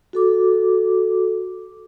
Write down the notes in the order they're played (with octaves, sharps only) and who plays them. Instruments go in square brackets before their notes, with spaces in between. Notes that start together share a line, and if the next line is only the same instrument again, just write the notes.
[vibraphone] F#4 A4 D6